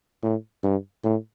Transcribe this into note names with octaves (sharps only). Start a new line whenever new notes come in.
A2
G2
A2